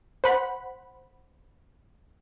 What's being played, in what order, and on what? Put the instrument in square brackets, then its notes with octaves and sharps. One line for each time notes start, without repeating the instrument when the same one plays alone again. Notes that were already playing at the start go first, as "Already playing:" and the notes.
[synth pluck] C5 F#5 B5